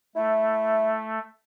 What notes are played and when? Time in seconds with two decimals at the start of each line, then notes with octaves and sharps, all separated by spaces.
0.16 A3 E4